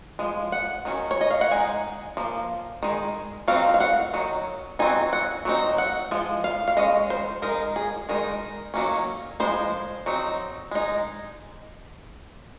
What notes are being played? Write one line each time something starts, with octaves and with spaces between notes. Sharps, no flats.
F3 G#3
F#5
D#3 F#3 C#4
C#5
D#5
F5
F#5
G#3 D#4 G#5
F3 A#3
D#3 G#3
F#3 C4 D#4 F5
F5
F#5
D#3 F#3
F#3 C4 D#4 G#5
F#5
F#3 C4 D#4
F#5
F3 G#3
F5
F5
G#3 C#4 D#5
C5
G#3 D#4 A#4
G#4
D#3 G#3 D#4 A#4
D#3 F#3 A#3 C#4
F3 G#3 C4 D#4 C5
F#3 C4 D#4
G#3 D#4